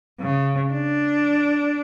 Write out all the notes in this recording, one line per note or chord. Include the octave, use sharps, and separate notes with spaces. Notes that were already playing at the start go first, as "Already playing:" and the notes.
C#3
D4